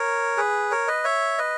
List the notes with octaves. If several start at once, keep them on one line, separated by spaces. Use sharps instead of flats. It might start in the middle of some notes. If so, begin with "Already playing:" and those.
Already playing: A#4 C#5
G#4 B4
A#4 C#5
B4 D#5
C#5 E5
B4 D#5